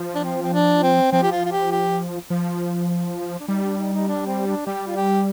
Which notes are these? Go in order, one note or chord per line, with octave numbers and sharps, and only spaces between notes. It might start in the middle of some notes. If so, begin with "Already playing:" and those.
Already playing: F3
D4
C4
C4
D4
C4
F3 C4
G4
F4
F4
G4
G4
F3
D4
G3 D#4
D4
D#4
D#4
D4
C4
D4
G3 G4
F4
G4